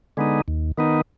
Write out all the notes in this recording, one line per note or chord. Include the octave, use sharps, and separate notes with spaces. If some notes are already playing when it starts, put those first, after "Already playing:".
D3 G#3 B3 D#4
D#2
D#3 B3 D#4